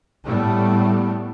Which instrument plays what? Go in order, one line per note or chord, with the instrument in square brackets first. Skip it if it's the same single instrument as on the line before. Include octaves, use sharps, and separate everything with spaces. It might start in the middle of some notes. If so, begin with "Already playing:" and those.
[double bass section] A2 G3 A3 B3